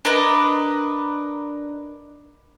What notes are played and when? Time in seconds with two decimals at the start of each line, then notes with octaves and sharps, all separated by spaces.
0.05 D4 A#4 B4 D#5